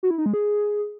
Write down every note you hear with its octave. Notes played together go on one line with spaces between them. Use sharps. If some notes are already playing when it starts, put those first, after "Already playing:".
F#4
E4
D#4
G#3
G#4